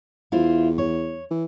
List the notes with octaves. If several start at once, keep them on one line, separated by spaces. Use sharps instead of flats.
E2 E4 F4 C5
C#5
E3